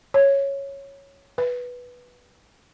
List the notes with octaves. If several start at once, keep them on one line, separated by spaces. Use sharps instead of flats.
C#5
B4